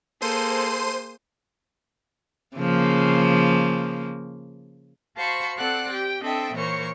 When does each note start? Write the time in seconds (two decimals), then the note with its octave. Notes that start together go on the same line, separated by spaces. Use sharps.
0.22 A#3 G#4 A4 C5 C6 D#7
2.57 C#3 F3 A#3
5.16 F#4 C5 F5 A5 B5 C#6
5.57 C4 A4 D5 F#5 F#6
5.93 G4 G5
6.23 C4 D4 A4 D#5 E5 G5
6.54 A#2 E3 A#4 C5 C#5 C#6